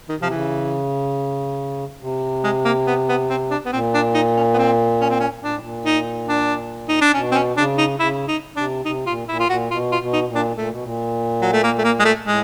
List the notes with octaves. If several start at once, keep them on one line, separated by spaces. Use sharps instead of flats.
D#3
C3 F3
C#3 E3
C3
G#3
A#3
B3
B3
C4
D4
B3
A#2 C4
D4
D#4
C#4
B3
C4
C#4
C4
C#4
A#2 D4
A2
A#2
D#4
D4
D#4
D4
B2 C#4
C4
C#4
C#3 D4
D#4
C#3 E4
D#4
C3 D4
C3 D#4
A#2 F4
A#2 E4
F4
A#2 F#4
B2 F4
F4
B2
D#4
A#2
D4
A#2 A3
B2
A#2
F#3
A3
A#3
A3
A#3
G#3
A3
A2 G#3